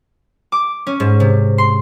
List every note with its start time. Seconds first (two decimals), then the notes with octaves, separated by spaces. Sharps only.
0.52 D6
0.87 C#4
1.00 G#2
1.20 C3
1.58 C6